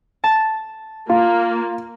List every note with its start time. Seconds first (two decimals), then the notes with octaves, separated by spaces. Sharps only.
0.24 A5
1.10 A#3 F4